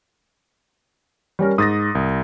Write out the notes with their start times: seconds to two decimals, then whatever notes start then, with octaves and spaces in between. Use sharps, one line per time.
1.39 G3 C#4 A#4
1.58 G#2 D#6 A6 A#6
1.95 C2